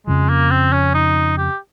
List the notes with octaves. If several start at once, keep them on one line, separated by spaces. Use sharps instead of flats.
F2 C#3 F3 G#3
A#3
C4
C#4
D#4
G4